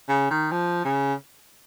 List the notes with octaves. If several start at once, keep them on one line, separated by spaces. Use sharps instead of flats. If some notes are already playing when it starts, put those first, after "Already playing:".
C#3
D#3
F3
C#3